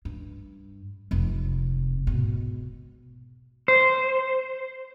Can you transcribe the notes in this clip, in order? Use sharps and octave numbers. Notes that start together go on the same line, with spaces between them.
G2
F1 C3
G#2 B2
C5